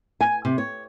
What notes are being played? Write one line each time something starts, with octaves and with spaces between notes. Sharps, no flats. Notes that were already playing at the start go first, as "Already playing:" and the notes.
G#5
C3
C#5